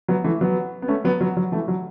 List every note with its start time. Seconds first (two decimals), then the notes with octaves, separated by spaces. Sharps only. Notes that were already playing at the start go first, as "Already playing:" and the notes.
0.08 F#3 B3
0.24 E3 A3
0.41 F#3 B3
0.82 B3
0.88 A3 C#4
1.04 F#3 B3
1.20 F#3 B3
1.37 F#3
1.52 E3 A3
1.68 F#3